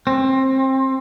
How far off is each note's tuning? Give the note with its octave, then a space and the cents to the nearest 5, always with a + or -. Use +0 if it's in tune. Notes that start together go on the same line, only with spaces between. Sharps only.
C4 +25